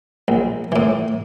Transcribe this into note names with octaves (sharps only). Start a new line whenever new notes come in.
A#1
A2 E3